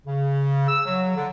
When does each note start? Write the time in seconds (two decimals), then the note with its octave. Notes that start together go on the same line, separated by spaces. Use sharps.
0.06 C#3
0.68 E6
0.85 F#3
1.15 D3